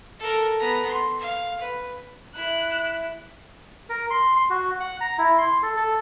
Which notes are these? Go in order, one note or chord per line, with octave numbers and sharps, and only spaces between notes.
A4 A#4
B3 A#5
C6
F5
B4
E4 F#6
A#4
C6
C6
F#4
F#5
A#5
E4
C6
A4
A4